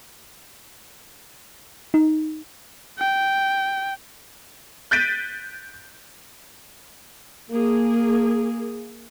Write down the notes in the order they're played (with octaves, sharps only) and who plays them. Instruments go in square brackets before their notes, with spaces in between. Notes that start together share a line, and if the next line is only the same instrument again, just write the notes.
[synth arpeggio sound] D#4
[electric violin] G5
[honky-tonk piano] F#6 G6 A6 B6 D7 D#7
[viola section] A#3 G#4